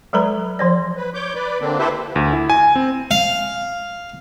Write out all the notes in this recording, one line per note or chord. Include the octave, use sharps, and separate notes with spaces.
F#3 G#3 A4 B4 A#5 B5
F3 C5 D5
B4
C#5 D6 G6
B4 D5
D3 A#3 C4 D4
E4 G4 A4 B4 C5 E5
D2
E4
G#5
C4
F5